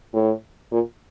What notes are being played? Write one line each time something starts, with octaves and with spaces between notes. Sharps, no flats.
A2
A#2